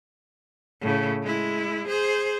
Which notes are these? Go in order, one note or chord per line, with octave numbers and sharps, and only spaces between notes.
A2 C#3
G#3 E4
G#4 C5